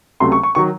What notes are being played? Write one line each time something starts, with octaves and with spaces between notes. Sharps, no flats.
C#2 C3 F#3 A3 C6
C#6
C#6
D#3 F#3 C#6